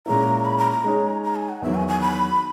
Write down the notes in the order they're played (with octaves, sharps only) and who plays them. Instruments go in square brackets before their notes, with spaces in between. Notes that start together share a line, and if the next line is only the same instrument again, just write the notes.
[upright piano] A#2 G#3 C#4 E4 [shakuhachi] A#5
[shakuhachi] B5
A#5
A#5
[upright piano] G#3 D#4 G#4 C#5
[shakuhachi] A#5
G#5
F#5
[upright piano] E2 D#3 F#3 [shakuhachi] E5
[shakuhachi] G#5
G#5
B5